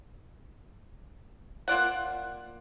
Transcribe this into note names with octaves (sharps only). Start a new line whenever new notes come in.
A#3 F4 D5 F#5